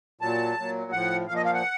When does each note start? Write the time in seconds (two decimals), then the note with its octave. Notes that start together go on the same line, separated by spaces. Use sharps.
0.21 A#2 F#3 A5
0.57 A#2 F#3
0.92 A2 F3 F#5
1.27 A#2 F3 F5
1.36 D#5
1.45 F5
1.54 F#5